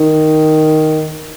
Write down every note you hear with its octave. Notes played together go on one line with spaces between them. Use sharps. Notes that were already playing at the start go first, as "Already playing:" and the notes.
Already playing: D#3